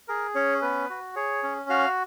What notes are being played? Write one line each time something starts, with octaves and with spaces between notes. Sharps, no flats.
G#4 A#4
C#4 C#5
B3 B4
F#4
G#4 C#5
C#4
F#4 F5